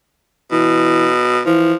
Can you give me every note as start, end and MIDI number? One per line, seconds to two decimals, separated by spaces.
0.52 1.41 47
0.52 1.09 52
1.46 1.73 52
1.46 1.74 53